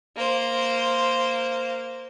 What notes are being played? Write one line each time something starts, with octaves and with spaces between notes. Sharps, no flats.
A#3 C5